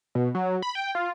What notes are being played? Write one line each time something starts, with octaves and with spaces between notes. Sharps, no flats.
B2
F#3
B5
G5
F4